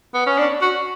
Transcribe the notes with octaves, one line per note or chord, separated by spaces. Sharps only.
B3
C#4
D4
F#4